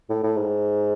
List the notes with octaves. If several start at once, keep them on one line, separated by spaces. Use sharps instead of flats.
A2
A2
G#2